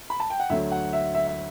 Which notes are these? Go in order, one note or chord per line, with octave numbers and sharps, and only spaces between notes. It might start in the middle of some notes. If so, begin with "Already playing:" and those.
B5
A5
G5
F#5
D2 D3 F#3 E5
F#5
E5
E5
E5